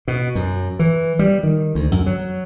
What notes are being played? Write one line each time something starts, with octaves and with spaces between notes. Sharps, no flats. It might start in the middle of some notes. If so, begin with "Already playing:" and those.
B2
F#2
E3
G3
D#3
D2
F#2
F#3